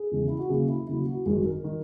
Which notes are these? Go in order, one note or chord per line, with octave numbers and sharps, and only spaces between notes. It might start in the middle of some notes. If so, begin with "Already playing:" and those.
Already playing: G#4
E2 C#3 G#3
E4
F#4
D#2 C#3 F#3 G#4
E4
D#2 C#3 F#3 E4
F#4
G#1 F#2 D#3 G#4
A#4
D#3